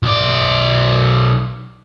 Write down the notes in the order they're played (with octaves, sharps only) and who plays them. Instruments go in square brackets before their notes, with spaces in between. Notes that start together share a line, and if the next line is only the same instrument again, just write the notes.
[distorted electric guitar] B1 D5